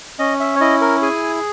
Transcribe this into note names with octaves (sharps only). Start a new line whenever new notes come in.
C#4 D#5
E5
C#5
E4 D#5
A#4
G#4 G#5